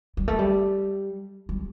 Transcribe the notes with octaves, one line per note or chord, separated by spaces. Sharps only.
G3
A3
G3
G3